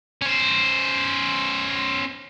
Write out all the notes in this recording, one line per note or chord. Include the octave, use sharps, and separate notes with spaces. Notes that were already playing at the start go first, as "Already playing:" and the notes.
C#4 C5